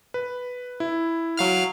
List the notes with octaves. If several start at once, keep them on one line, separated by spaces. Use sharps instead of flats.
B4
E4
F#3 F5 F6